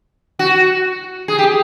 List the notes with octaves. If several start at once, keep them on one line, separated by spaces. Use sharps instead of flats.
F#4
G#4
G4